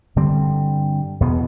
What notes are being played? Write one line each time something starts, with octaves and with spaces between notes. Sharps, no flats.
G2 D3 G3 C4
E2 B2 B3